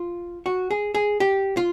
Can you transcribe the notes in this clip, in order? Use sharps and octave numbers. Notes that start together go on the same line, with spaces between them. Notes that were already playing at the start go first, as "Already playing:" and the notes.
Already playing: F4
F#4
G#4
G#4
G4
F4